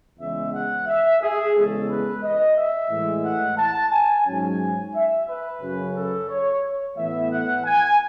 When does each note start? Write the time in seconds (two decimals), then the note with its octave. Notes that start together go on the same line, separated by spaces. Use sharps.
0.19 E2 C#3 E3 G#3 E5
0.54 F#5
0.88 E5
1.22 G#4
1.55 E2 C#3 G#3 C#4 A4
1.89 B4
2.23 D#5
2.57 E5
2.90 A2 E3 G#3
3.24 F#5
3.58 A5
3.92 G#5
4.26 G#2 F#3 C#4 G#5
4.94 E5
5.27 B4
5.62 F#2 C#3 F#3 C#4
5.95 A4
6.29 C#5
6.96 A2 E3 B3 E5
7.31 F#5
7.65 G#5